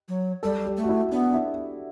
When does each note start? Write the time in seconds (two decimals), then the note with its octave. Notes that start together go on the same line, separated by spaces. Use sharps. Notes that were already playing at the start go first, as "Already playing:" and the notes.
0.08 F#3
0.43 G3 A4
0.66 G4
0.77 A3
0.84 F#4
0.89 E4
1.12 B3 D4
1.30 D4
1.34 E4